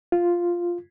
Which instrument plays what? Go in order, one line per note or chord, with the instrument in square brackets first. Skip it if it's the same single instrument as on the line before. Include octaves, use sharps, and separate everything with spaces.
[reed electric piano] F4